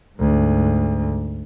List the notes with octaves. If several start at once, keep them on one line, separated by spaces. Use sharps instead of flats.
D2 G#2